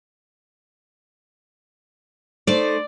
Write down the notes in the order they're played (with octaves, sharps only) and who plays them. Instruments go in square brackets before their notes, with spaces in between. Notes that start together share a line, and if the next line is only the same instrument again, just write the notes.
[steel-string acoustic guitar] A3 D#4 C5 [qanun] D5